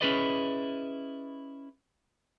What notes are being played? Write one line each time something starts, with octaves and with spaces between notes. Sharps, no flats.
C#4 E4 G#4 B4 D5 D#5